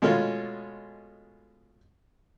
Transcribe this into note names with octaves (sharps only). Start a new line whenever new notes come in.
B2 G#3 A3 C#4 F4